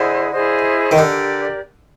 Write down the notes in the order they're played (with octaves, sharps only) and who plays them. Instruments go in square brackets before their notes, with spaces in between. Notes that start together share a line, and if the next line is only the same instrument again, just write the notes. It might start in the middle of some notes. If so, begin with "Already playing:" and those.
Already playing: [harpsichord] D3 [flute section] E4 G#4 C5 D#5
[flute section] E4 G#4 C5 D#5
[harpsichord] D#3
[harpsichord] D3 [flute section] G4 A#4 D5